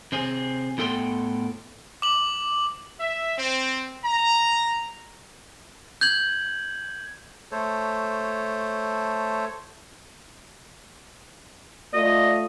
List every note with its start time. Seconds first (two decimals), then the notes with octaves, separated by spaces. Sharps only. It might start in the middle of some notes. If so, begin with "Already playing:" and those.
0.12 C3 C4 G#4
0.78 A2 B3 A4 G5 C6
2.02 D6 F#7
3.00 E5
3.38 C4
4.04 A#5
6.01 G6 G#6 F#7
7.52 A3 A4 C5 C#5
11.94 A3 F4 D5 D#5